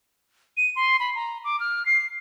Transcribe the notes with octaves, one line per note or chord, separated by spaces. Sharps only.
D#7
C6
B5
A#5
D6
F6
C7